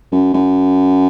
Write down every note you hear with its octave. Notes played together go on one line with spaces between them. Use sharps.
F#2
F#2